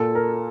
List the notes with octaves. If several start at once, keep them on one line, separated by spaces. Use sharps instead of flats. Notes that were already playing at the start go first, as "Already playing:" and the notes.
Already playing: A#2 A4
A#4